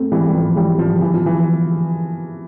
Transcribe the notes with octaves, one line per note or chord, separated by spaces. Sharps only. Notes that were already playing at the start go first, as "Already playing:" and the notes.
Already playing: A3 C4
E3 G3
G3
F3
E3 G3
F3
E3
F3
E3